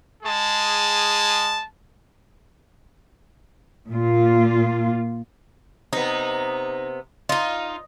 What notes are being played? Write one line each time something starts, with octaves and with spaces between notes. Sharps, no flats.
G#3 G#4 A5
A#2 F4
C3 B3 D#4
D#4 F4 D#5